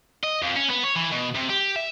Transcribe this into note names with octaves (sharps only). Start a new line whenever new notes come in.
D#5
F2
C#4
B3
C#5
E3
B2
C3
G4
E5